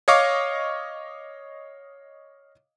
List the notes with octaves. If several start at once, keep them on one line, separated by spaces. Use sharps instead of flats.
C#5 D#5 F5 C#6 D6